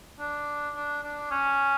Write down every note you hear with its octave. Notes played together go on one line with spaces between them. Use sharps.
D4
D4
D4
C#4